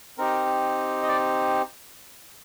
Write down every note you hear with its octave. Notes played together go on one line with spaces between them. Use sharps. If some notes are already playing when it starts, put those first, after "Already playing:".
C4 D#4 G4 A#4
D#5
D5